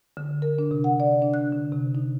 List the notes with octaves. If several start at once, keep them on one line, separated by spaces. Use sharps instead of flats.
D3
A#4
D4
C3
F#5
D5
D4
F#6
D3
C3
D#4